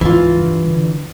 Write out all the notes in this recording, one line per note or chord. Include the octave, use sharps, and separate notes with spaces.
C#2 G#2 E3 F3 F4
G2
D3